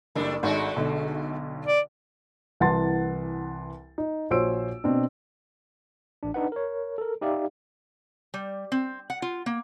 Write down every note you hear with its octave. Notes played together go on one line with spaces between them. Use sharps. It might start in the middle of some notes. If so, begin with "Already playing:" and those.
F#1 G3 A3 D4
G#1 G#3 A3 F#4
B1 D3
D5
C2 E3 F#5 A5 C6 A6
D#4
A#1 F#4 C5 C#5 E6 D7
B2 C4 D4
A1 D4
D4 D#4 B4 F#5
A#4 C#5
A4 A#4
D#4 G4 D5 E5 F5
G3
C4
F#5
F4
A#3